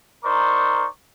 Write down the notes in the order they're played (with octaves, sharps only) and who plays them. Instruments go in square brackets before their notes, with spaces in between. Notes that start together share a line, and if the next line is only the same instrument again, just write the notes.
[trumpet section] D#4 A#4 C5 D5 C#6